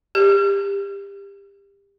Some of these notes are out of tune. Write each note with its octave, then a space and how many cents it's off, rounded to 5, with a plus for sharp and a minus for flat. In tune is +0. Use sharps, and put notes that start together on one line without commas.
G4 +25